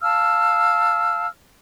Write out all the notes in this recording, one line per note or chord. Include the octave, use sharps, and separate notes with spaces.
F5 A5 E6 F6